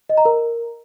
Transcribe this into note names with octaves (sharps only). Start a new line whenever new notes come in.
D#5
A#5
A#4